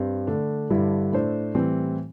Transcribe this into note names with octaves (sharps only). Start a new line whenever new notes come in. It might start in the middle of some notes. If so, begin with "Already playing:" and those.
Already playing: G2 G3 C4
D3 A3 D4
G2 D3 G3 E4
A2 A3 D4 C5
A2 E3 G3 C4